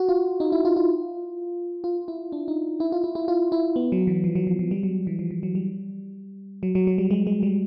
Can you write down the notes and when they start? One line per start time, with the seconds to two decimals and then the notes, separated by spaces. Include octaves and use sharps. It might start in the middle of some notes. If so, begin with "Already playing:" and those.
Already playing: F#4
0.09 F4
0.40 D#4
0.52 E4
0.65 F4
0.77 F4
1.84 F4
2.08 E4
2.32 D4
2.48 D#4
2.80 E4
2.92 F4
3.04 E4
3.15 E4
3.28 F4
3.52 E4
3.76 B3
3.92 F#3
4.07 E3
4.24 F3
4.35 F#3
4.47 F3
4.59 F3
4.71 G3
4.83 F#3
5.07 E3
5.19 F3
5.31 E3
5.43 F#3
5.55 G3
6.63 F#3
6.75 F#3
6.87 F#3
6.98 G3
7.11 G#3
7.27 G#3
7.43 G3